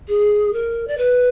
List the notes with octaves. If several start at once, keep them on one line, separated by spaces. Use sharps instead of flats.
G#4
A#4
D5
B4